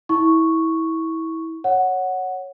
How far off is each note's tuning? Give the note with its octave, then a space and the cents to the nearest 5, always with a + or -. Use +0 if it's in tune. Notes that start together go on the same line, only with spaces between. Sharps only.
E4 -25 C#6 +0
C#5 +0 F#5 +0